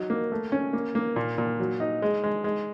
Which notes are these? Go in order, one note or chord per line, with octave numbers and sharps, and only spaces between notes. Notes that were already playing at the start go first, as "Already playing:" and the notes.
Already playing: F#3 D#4
A#3
A3
C#4
A#3
A#3
A#2
A#2
F#3
D#4
G#3
G#3
G#3